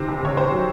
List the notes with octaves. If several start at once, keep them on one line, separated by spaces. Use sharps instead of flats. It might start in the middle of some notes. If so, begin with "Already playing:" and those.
Already playing: C3 D#3 C5
C2
C3 C#5
C3 C5
F#3